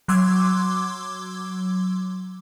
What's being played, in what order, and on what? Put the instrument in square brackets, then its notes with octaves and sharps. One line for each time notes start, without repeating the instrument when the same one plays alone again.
[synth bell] F#3 C6 D6 E6 G#6